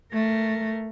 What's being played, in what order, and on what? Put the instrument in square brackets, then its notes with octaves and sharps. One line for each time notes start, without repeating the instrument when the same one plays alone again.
[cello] A3 A#4